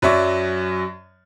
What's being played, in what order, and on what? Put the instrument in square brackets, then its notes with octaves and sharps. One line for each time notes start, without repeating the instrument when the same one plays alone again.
[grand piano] F#2 F#3 D5 E5 C#6